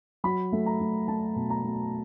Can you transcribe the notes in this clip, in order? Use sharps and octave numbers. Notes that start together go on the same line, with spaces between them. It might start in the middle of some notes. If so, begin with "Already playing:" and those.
F#3 B5
A3
A#5
A3
A3 A5
B2
A#5
A3